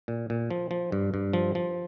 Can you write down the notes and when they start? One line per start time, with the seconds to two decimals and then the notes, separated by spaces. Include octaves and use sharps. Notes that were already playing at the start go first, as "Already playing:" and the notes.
0.08 A#2
0.30 A#2
0.51 F3
0.71 F3
0.92 G2
1.14 G2
1.33 F3
1.55 F3